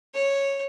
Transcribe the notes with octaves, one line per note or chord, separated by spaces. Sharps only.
C#5